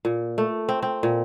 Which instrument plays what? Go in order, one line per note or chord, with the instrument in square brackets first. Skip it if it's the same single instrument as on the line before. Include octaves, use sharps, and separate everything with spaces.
[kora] A#2
A3
C4
C4
A#2